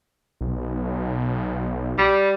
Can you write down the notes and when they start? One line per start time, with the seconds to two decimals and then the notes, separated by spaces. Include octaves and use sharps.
0.41 B1
1.98 G3